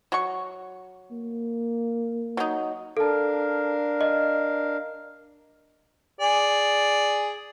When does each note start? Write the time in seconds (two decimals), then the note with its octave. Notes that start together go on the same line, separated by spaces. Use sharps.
0.12 F#3 C#6
1.11 A#3
2.37 F#3 D#4
2.97 D4 A4 A#4 F5 A5
4.01 D#5
6.21 G#4 D5